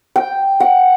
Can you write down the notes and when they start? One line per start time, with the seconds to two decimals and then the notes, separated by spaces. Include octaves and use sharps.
0.16 G5
0.60 F#5